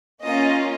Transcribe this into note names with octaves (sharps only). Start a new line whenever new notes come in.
A#3 C#4 F4 D#5